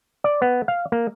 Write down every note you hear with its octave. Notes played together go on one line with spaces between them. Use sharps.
D5
B3
F5
A#3